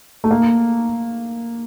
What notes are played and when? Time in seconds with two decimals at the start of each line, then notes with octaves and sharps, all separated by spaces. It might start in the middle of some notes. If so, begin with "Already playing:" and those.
0.24 A3
0.31 A#3